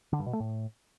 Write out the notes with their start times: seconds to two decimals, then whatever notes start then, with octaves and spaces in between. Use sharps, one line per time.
0.13 D3
0.19 G2
0.26 B2
0.33 A3
0.40 A2